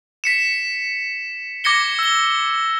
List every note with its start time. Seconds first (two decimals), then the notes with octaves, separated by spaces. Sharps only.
0.24 B6 C#7 E7
1.64 D6 G#6 A#6 C#7 G7
1.99 E6 G7